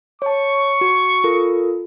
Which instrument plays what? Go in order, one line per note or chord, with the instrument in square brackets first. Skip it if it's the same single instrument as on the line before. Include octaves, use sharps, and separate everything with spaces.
[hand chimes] C#5 A5 [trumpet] C#6
[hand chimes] F#4
F4 A4 A#4